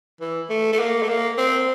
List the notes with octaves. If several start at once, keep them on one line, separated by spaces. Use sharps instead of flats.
E3
A3
A3
A#3
A3
A#3
C4